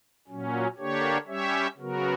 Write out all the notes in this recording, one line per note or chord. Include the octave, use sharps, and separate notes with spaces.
A#2 F#3 C#4
D3 A#3 D4 G4 C#5
G3 C#4 G4 C#5 E5
C#3 F#3 B3 F#4 A#4